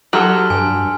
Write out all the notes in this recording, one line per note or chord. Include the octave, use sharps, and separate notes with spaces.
F#3 G4 A4 C6 F6
G2 G#5